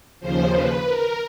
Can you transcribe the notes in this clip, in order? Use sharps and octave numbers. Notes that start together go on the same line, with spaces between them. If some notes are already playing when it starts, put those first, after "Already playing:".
D#2 C#3 F3 C5
B4
A#4